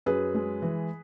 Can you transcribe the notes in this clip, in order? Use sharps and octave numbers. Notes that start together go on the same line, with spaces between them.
F#2 G#4 B4
G#3
E3